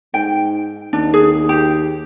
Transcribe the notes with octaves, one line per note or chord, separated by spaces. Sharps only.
G#2 G5
D#2 D4
G#4
G4